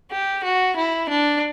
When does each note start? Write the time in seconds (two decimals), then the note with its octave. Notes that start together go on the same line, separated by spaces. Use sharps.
0.11 G4
0.44 F#4
0.77 E4
1.09 D4